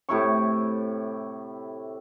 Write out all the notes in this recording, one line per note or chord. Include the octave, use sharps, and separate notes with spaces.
A2 C3 E4 C#6